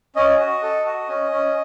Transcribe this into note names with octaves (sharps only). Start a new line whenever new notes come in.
C#4 D#5
F#4
A4
F#4
C#4
C#4